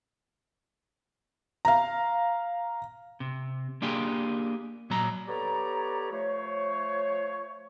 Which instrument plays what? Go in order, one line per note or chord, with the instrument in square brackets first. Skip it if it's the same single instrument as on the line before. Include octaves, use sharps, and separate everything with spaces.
[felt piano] F5 A#5
[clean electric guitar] C3
A#3 D4 F4 G4 G#4
A#2 F#3 A#5
[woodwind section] B3 G4 A4 C#5 D5 A#5
F3 A3 C5 C#5